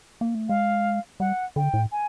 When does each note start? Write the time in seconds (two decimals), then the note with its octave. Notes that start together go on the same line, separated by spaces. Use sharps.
0.21 A#3
0.35 A3
0.49 G#3 F5
1.20 G3 F#5
1.56 D3 G5
1.74 A2
1.92 G#5